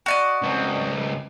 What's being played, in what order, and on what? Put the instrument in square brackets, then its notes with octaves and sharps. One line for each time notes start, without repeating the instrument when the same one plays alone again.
[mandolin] F#4 D5 D#5
[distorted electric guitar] C#2 C4